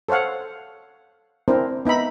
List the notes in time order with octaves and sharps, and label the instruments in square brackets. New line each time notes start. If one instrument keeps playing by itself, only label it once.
[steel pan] A4 C5 C#5 F5 F#5
C4 D4 E4 A#4 C5
B3 D#4 E5 B5